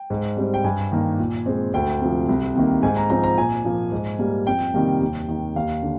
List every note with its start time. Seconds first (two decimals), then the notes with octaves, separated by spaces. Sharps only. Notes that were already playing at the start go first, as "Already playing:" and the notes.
Already playing: G5
0.10 G#2
0.37 G3 C4
0.54 G5
0.64 G2 G#5
0.92 D#3 A#3
1.19 A#2
1.46 G#3 C4
1.74 D2 G5
2.01 C3 F3
2.29 C2
2.55 C3 D#3 A#3
2.83 G#2 G#5
2.96 A#5
3.10 F3 C4 A#5
3.24 A#5
3.38 A#2 G#5
3.65 F3 A#3
3.92 G#2
4.19 G3 A#3
4.47 F2 G5
4.74 C3 D#3 G3 A#3
5.01 D#2
5.28 D#3 A#3
5.56 D#2 F5
5.83 D3